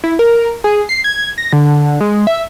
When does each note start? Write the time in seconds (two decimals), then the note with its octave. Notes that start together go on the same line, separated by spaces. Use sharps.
0.04 E4
0.19 A#4
0.64 G#4
0.89 C7
1.04 G#6
1.38 A#6
1.53 D3
2.01 G#3
2.27 E5